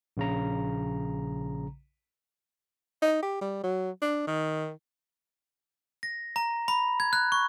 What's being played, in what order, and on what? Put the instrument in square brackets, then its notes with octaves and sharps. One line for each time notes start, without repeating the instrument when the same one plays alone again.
[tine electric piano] A#1 C#3 A#5
[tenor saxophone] D#4
G4
G3
F#3
D4
D#3
[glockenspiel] A#6
A#5
B5
G#6
F#6
C#6